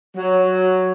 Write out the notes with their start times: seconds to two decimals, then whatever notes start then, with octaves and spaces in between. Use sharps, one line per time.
0.16 F#3